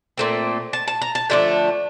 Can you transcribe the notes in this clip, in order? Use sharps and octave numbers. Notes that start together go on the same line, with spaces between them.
A#2 A3 C4
A5
A5
A#5
A5
D3 F3 A3 D4 E5